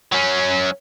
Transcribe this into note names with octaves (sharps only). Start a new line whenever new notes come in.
F#3 C#4